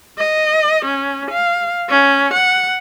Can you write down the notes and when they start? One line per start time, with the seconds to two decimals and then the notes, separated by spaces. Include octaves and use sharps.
0.18 D#5
0.85 C#4
1.31 F5
1.89 C#4
2.34 F#5